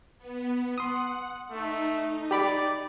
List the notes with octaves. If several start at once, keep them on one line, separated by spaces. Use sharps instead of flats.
B3
F#5 C6 D#6
A3 D#4
G4 D5 B5 D6